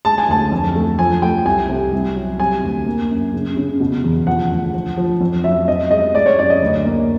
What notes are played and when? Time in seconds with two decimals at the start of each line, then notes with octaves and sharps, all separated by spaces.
0.05 G#3 A5
0.18 G#5
0.28 D2 A5
0.52 F2
0.75 A3
0.98 F3 G#5
1.22 A3 G5
1.46 C2 G#5
1.69 C3
1.93 C2
2.16 F#3
2.39 C3 G#5
2.63 D2
2.87 A#3
3.10 F#2
3.33 C#3
3.56 C#3
3.80 B2
4.04 E2
4.27 F3 F#5
4.51 D2
4.74 F3
4.97 F3
5.21 F2
5.44 F#3 E5
5.68 C4 D#5
5.91 G#3 D#5
6.15 G#3 D5
6.26 C#5
6.38 F#2 D5
6.50 D#5
6.62 D2
6.85 A#3